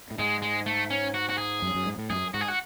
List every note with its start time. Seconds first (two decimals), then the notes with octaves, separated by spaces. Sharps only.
0.11 A2
0.19 G#2 G#3
0.42 G#3
0.66 A3
0.90 C#4
1.14 F#4
1.29 F#4
1.38 G#4
1.62 F#2
1.74 F#2
1.86 G#2
1.98 A2
2.10 F#2 G#4
2.34 G#2 F#4
2.41 G#4
2.48 F#4